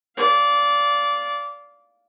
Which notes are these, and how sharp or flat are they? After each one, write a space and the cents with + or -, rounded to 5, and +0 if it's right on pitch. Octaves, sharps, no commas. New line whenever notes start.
D5 -20 F5 +0